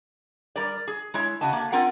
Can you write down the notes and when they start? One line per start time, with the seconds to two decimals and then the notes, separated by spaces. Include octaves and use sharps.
0.56 G3 A#4 D5
0.87 G#4
1.14 G#3 E4 C#5
1.41 C#3 F#4 D#5 A5
1.53 A3 A#3
1.72 C4 F4 A#4 F#5